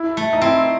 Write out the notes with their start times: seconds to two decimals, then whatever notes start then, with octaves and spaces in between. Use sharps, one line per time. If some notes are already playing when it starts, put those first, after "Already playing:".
Already playing: E4
0.17 A3
0.33 D#4
0.41 C4 E4